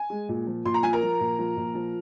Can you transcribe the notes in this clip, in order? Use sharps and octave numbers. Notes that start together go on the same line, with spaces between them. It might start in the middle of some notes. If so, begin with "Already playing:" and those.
Already playing: G#5
G#3
A#2
F3
A#2 C6
A#5
F3 G#5
A#4 A#5
F3
A#2
F3
A#2
F3